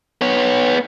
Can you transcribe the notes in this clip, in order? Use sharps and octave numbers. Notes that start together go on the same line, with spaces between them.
B3 C#5